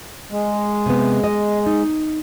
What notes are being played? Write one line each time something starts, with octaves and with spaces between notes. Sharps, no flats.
G#3
C3 B3
D#5
D#4